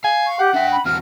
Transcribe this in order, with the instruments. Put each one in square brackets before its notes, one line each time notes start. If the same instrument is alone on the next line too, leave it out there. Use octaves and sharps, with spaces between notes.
[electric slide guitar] F5 [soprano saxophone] G#5
[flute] C#6
[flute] G4 [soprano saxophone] F#5
[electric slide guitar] D4 G5 [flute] E5
[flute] B5
[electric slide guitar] E2 C4 F#4 [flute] F6